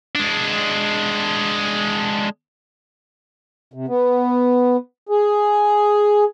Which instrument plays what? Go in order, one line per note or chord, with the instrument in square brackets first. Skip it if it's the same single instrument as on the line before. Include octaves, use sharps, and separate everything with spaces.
[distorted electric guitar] G#3 D4
[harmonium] C3
B3
G#4